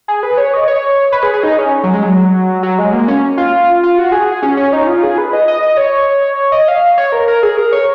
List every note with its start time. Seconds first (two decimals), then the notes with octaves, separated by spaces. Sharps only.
0.08 G#4
0.23 B4
0.37 C#5
0.54 D#5
0.68 C#5
1.12 B4
1.23 G#4
1.34 G#4
1.43 D#4
1.59 C#4
1.83 F#3
1.93 G#3
2.03 F#3
2.63 F#3
2.78 G#3
2.93 A#3
3.08 C#4
3.38 F4
3.83 F4
3.98 F#4
4.12 G#4
4.43 C#4
4.57 C#4
4.73 D#4
4.87 F4
5.03 G#4
5.18 B4
5.33 D#5
5.48 D#5
5.63 D#5
5.77 C#5
6.52 D#5
6.68 F5
6.98 C#5
7.12 A#4
7.28 A#4
7.43 G#4
7.57 A#4
7.72 C#5